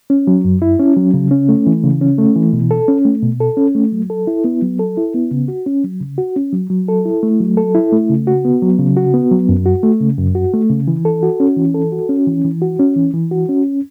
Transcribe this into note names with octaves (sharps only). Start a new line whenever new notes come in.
C#4
F#3
F#2
E4
C#4
F#3
C#3
C#4
A3
E3
C#3
C#4
A3
E3
B2
A4
C#4
A3
B2
A4
C#4
A3
F#3
A4
E4
B3
F#3
A4
E4
B3
C#3
F#4
C#4
F#3
C#3
F#4
C#4
F#3
F#3
A4
E4
A3
F#3
A4
E4
A3
C#3
F#4
B3
F#3
C#3
F#4
B3
F#3
F#2
F#4
A3
C#3
F#2
F#4
A3
C#3
E3
A4
F#4
C#4
E3
A4
F#4
C#4
E3
E3
F#4
C#4
E3
E3
F#4
C#4